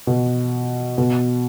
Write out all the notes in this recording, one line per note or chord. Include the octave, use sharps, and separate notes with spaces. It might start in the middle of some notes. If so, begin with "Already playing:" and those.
B2
B2